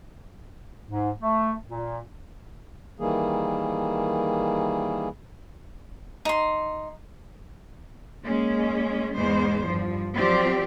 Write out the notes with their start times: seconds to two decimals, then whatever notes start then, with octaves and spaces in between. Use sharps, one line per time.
0.89 G#2
1.20 A3
1.68 A#2
2.99 D#3 E3 G3 A#3 G#4
6.25 D#4 C6
8.22 G#3 A#3 C#4
9.15 E2 G#2 G#3 B3 C5
9.66 G2 F3
10.14 F3 F#3 C4 G4 C5 D5